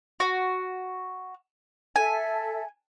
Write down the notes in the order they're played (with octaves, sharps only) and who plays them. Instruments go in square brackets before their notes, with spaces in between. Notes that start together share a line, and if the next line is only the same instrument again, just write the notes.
[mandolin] F#4
[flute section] A4 E5 [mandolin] G#5